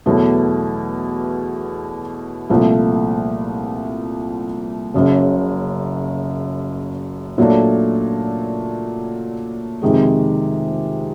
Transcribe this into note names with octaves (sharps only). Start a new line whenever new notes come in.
E2 B2 F#3 A3
C2 A#2 F3 A3
F#1 F#2 C#3
A#2 F#3 A3 D4
F2 C3 D#3 G#3